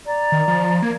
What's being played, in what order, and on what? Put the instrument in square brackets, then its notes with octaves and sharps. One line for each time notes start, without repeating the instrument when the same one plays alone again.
[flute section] D5 A#5
[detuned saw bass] D#3
F3
[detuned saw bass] A#3 [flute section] G#6